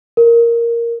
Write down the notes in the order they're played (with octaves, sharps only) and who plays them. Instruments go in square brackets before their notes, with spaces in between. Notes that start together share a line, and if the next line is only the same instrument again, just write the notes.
[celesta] A#4